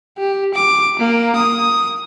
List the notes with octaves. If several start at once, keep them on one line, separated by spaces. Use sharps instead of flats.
G4
D6
A#3
D#6